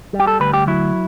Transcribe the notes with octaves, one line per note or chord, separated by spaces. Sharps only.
G3
G4
A4
D2 B4
G4
F#3 E4